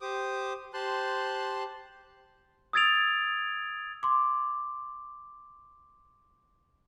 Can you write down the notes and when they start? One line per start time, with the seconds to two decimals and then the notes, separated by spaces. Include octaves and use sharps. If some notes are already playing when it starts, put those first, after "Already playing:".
0.01 G4 C5 D6 D#6
0.74 G4 C5 A5 C6 F#6
2.73 D#6 E6 G#6 A6 D7 F7
4.03 C6 D6